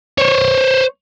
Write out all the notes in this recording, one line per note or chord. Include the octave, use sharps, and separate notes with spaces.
C5 C#5